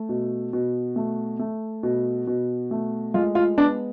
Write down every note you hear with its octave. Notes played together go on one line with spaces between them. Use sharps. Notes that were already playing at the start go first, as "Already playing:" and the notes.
Already playing: A3
B2
B2
A3
A3
B2
B2
A3
G#3 F4
F4
B3 D4